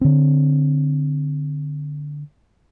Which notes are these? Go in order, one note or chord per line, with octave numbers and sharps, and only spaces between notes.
D3 C4